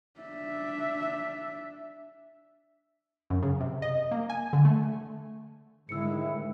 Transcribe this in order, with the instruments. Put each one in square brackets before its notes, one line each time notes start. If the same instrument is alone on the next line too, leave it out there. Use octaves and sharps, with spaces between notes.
[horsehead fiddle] D4 E5
[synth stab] F#2
C#3
C3
D#5
A#3
G#5
D3
A3
[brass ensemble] G#2 D#3 [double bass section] D3 G#3 [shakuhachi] E4 [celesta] E6 C#7